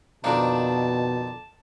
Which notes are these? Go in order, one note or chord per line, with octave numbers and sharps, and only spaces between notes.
F2 B2 D#3 A#3 D4 A5